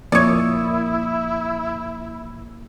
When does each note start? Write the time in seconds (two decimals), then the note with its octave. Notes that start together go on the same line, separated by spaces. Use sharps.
0.12 F2 A#2 A#3 E4 C#5 D5 D#6